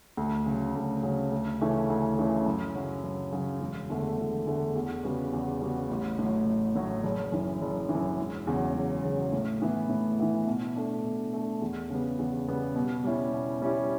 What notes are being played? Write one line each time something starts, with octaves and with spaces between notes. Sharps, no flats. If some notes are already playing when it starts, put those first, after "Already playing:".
D2
C#3 F#3
D2
C#3 F#3
D2
C#3 E3 A3 C#4
D2
C#3 E3 A3 C#4
F#2
C#3 F#3
F#2
C#3 F#3
E1
E2 D3 A3
E1
E2 D3 A3
E2
C#3 G3 B3 F#4
E2
C#3 G3 B3 F#4
A1
A2 F#3
A1
A2 F#3
F#1
F#2 E3
F#1
E3
F#2
E1
E2 C#3 F#3
E1
E2 C#3 F#3
A2
E3 B3 E4
A2
E3 B3 E4
B2
A3 D4
B2
A3 D4
E2
C#3 G3 B3
E2
C#3 G3 B3
B2
G3 C#4 E4 G4
B2
G3 C#4 E4 G4